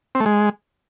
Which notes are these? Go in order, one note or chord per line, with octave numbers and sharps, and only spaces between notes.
C4
A3
G#3